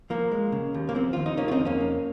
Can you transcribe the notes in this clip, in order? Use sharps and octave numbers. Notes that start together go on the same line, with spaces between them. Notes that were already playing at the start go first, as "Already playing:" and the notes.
F3 A#3
G#3
C#3
D#2
A#3
F3 C4
D#2 F4
D#4
C#3 A#3 C#4
F4
C4 D#4
F2
A#3 C#4
F2